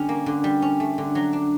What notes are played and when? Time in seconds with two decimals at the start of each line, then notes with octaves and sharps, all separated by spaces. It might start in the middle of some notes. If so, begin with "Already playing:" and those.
Already playing: D3 G3 C#4
0.09 A#3
0.26 D3
0.44 G3
0.62 C#4
0.80 A3
0.98 D3
1.15 F#3
1.33 D4